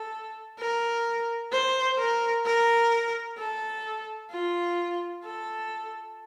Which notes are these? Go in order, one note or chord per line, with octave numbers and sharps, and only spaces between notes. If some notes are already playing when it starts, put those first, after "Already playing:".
Already playing: A4
A#4
C5
A#4
A#4
A4
F4
A4